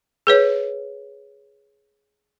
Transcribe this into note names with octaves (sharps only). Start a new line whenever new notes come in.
G#4 B4 C#5